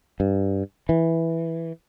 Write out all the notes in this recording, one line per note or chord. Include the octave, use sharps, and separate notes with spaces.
G2
E3